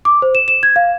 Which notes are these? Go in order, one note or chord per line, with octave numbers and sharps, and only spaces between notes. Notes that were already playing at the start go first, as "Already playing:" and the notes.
D6
C5
E7
E7
G#6
F5